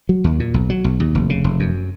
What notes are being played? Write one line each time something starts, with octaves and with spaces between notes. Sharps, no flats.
F#3
D#2
A#2
B1
F#3
B1
D#2
F1
C#3
F1
F#2